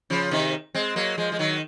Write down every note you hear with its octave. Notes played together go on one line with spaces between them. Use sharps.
C#3 F3
C3 D#3
G#3 C4
F#3 A#3
F3 G#3
G#3
D#3 F#3